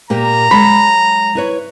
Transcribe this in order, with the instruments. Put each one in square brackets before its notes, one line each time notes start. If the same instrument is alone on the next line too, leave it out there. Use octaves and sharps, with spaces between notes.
[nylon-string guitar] A#2 A#3 G4 [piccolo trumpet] A#5
[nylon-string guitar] F#3 G#3 A5 [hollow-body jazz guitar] B5
[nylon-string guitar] E4 B4 C#5